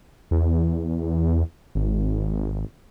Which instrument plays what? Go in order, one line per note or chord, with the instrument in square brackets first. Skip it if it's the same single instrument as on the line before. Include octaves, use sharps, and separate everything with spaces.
[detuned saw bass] E2
G#1